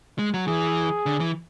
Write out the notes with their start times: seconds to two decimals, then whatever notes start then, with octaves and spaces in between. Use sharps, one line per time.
0.19 G#3
0.34 F#3
0.48 E3 G#4
1.06 D3
1.20 E3